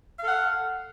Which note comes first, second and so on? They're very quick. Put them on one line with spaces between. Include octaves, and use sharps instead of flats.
F5 A4 F#5